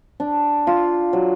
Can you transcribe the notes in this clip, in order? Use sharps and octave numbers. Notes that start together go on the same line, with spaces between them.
D4
F4
F#3